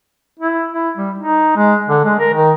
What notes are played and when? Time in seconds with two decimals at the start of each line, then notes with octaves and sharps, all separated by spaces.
0.39 E4
0.72 E4
0.97 G3
1.18 D#4
1.57 G#3
1.88 D3
2.05 G#3
2.19 A#4
2.33 D#3